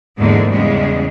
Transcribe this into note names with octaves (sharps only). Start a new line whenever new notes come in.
E2 G#2 D3 G#3 A#3
E2 C#3 G3 G#3